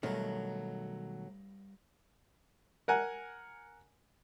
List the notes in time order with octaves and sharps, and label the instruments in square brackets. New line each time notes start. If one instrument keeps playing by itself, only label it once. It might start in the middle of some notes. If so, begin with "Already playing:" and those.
[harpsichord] G2 E4 [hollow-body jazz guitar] B2 D#3 [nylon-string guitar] F#3 [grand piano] A3
[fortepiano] A#4 F#5 G#5